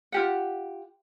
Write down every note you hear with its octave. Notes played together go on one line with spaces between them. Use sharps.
F4 G4 F#5